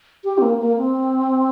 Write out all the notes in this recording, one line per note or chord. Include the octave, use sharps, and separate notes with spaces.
G4
C4
A#3
A#3
C4